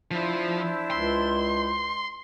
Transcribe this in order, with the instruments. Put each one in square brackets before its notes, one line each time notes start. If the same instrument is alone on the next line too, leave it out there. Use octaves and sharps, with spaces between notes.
[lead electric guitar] F3 [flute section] D4 E4 C5
[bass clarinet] C#2 [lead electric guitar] C6